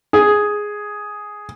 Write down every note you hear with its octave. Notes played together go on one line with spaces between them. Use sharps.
G#4